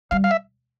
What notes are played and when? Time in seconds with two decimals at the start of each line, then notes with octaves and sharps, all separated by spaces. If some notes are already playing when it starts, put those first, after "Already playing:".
0.11 G3 F5
0.24 F5
0.31 E5